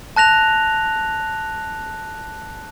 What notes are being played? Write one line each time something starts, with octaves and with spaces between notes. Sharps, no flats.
A5 F#6 A#6 F7